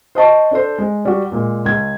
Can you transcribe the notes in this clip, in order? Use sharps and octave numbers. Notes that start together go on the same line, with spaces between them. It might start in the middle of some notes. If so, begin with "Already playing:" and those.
C5 D#5 A5 C#6
D4 A4 C5
G#3
G3 F#4
A#2 G#3
C#2 G#6